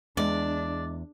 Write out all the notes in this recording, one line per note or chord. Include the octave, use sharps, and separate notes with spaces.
E2 G#3 D4 D5